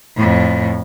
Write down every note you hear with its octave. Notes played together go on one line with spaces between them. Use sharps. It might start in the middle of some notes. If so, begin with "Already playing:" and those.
F2 A2